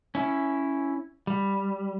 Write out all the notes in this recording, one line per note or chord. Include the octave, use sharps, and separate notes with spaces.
C#4 E4
G3